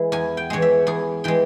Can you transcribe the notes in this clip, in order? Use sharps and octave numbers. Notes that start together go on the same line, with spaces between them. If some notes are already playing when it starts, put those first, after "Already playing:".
Already playing: E3 G#3
E2 G#5
G5
E3 G#3 C#5
E5
E2 G#4
E3 G#3 G5